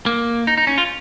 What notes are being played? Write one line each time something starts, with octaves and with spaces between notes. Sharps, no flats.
A#3
D#4
D#4
C#4
F4